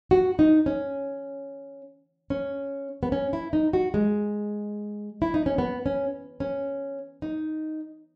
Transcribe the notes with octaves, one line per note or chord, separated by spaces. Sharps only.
F#4
D#4
C#4
C#4
B3
C#4
E4
D#4
F#4
G#3
E4
D#4
C#4
B3
C#4
C#4
D#4